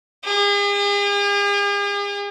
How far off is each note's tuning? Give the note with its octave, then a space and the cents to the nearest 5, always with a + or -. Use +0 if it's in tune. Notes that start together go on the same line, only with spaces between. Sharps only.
G#4 -45